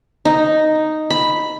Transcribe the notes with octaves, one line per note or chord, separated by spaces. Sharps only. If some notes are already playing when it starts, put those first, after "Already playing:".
D#4
B5